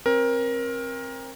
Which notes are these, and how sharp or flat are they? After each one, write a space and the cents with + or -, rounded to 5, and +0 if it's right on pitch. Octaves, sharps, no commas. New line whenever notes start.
C4 +30 A#4 +20